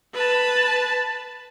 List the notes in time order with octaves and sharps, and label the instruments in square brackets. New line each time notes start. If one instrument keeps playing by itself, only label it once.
[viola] B4 A5